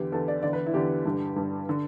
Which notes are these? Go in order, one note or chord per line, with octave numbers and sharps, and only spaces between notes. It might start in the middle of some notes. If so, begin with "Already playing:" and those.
Already playing: E2 D3 G4
E2 D3 A4
D5
E2 D3 D5
B4
E4
E2 D3 G4
G2 D3
G2 D3
D3